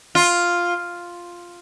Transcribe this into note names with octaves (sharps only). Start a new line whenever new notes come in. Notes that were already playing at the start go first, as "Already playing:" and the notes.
F4